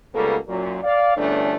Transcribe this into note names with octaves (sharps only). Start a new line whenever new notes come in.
C#2 C#3 G3 A#3 B3 A4
F#2 A#2 F#3
D5 F5
G1 E2 G2 A3 C#4 D4